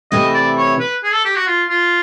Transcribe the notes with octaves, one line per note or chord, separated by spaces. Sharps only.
C3 E3 A3 C4 E4 D#5
D5
C#5
B4
G#4
A4
G4
F#4
F4
F4